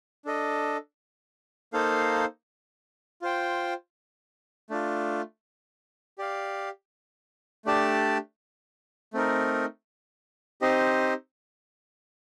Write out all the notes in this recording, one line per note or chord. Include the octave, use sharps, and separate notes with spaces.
D4 A4 D#5
A#3 D#4 A4 C5 F5
F4 C5 G5
A3 D4 F4
G4 D5 F5
A3 D4 G4 D5 A5
A3 C4 D#4 A#4
C4 D#4 G4 C5 D#5